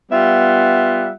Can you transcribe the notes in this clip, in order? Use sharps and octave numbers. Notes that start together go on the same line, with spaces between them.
G3 B3 F4 E5 F#5